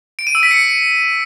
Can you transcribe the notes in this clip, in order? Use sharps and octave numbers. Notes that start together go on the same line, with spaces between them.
D7
D#7
E6
B6
C#7